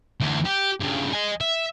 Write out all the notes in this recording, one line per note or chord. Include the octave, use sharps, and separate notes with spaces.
D2 E3
G4
G2 C#3
D#5 G#5
E5